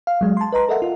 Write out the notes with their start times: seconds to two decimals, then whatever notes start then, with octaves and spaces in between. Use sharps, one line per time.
0.07 F5
0.21 F#3 G#3
0.37 A5 C6
0.53 B4 D#5 A#5 C6
0.69 A4 A#4 D#5 E5 F#5
0.82 F4